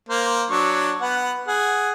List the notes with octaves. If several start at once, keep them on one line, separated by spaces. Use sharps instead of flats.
A#3 C5
F#3 D4 C#6
B3 F#5
G#4 F#5